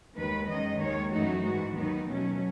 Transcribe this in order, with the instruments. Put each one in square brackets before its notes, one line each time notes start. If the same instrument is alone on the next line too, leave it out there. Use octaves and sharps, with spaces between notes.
[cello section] D#2 D#3 G#3 B4
F#2 D#3 G#3 D#5
D#2 D#3 G#3 C#5
F#2 E3 A3 D#4 F#4
G#2 E3 G#3 F#4
D#2 D#3 F#3 B3 D#4
B2 F#3 A3 C#4